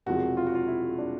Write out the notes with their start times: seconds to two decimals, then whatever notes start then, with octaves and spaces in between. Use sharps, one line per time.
0.06 E1 E2 C3 F3 F#4
0.37 F4
0.47 F#4
0.55 F4
0.68 E4
0.98 D4